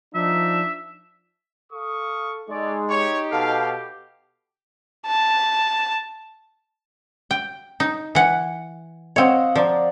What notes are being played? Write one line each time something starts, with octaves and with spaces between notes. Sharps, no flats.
F3 D4 D#4 E5
A4 F5 C#6 D#6
G#3 D#4 A4 C#5 D5
G4 C#5
B2 A4 F5
A5
G5
D#4
E3 F#5
C4 C#5 D#5 F5 F#5
F3 D5 A#5